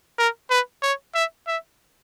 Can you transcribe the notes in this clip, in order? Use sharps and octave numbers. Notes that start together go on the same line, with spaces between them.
A#4
B4
C#5
E5
E5